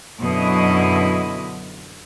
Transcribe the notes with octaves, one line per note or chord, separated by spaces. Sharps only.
F#2 B2 D3 E4 D#5